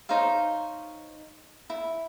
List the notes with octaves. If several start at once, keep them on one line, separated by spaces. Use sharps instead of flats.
D#4 C5 C#5 F5
E4